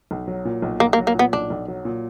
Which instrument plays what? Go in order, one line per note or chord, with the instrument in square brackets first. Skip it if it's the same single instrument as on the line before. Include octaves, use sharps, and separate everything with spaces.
[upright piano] B1
F#3
A#2
B1
[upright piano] B1 [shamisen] A#3
[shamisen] A#3
[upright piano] F#3
[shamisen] A#3
[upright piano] A#2 [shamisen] B3
[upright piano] B1 [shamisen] D4
[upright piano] B1
F#3
A#2